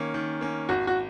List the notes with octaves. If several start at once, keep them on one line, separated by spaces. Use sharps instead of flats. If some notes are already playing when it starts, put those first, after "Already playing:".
Already playing: D#3 A#3 C#4
D#3
A#3 C#4
G#1 F#4
F#4